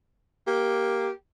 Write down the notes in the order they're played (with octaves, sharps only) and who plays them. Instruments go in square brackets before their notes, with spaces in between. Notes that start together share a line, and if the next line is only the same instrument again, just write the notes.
[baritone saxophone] A#3 [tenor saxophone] G4